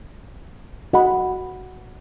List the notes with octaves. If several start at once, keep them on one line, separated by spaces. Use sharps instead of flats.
F#4 D#5 F#5 B5